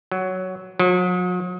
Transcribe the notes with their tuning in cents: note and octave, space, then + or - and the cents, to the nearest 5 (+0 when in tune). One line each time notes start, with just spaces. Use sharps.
F#3 +5
F#3 -45